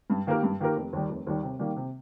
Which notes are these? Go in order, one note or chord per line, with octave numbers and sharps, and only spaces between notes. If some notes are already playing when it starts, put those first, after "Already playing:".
G2
D#3 A#3 G4 A#4
G2
D#3 A#3 G4 A#4
F1
D#2 D#3 G3
F1
D#2 D#3 G3
C3
D#3 G3 A#3
C3